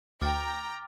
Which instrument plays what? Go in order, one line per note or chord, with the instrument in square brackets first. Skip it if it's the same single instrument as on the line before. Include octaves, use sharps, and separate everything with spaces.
[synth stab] D2 [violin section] G5 A#5 [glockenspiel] D6 F6 A6